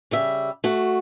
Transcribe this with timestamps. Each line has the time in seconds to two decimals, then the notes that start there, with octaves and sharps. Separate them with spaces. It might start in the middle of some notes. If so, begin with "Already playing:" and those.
0.11 C#3 G3 E5
0.64 A3 F#4